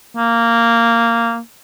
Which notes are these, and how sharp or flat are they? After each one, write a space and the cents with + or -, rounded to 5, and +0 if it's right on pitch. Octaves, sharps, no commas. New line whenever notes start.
A#3 -10